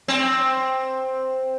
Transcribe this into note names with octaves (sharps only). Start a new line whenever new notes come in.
C4